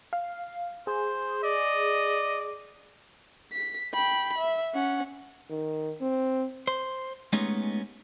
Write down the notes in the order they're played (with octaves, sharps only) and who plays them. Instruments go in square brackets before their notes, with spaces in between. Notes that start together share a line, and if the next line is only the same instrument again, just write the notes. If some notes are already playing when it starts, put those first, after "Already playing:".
[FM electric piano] F5
[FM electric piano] G#4 [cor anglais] C5
[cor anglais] D5 [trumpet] D#5
[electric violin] B6
G5 B5
E5
C#4 F#5
[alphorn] D#3
C4
[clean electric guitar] C5
G#3 A3 B3 C#4 D#4 G4